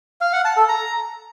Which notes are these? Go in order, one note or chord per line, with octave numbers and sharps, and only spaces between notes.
F5
F#5
A5
A4
A#5